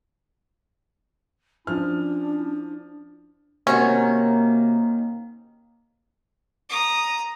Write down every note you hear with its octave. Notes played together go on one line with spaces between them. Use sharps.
F3 C#4 D4 E4 F6
C3 D#3 A#3 C#4 F#4 C#5
A#5 D#6